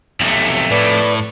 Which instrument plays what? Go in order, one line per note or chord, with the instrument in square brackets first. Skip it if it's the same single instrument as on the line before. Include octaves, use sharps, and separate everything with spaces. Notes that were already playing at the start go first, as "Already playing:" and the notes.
[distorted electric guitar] B1 C3 [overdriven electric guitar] F2 A3
[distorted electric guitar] A2 [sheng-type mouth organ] B4 D5